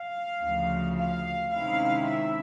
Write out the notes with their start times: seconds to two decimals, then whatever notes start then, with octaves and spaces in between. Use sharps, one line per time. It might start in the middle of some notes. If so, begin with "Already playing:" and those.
Already playing: F5
0.42 D2 C#3 F3
0.97 F5
1.51 C3 D#3 G#3 C#4 E4 F5
2.07 E5